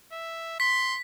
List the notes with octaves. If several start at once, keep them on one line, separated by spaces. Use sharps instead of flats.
E5
C6 B6